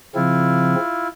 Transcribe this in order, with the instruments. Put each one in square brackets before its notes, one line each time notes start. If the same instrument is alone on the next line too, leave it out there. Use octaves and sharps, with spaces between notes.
[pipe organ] C#3 F3 C4 [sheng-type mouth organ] E4 F4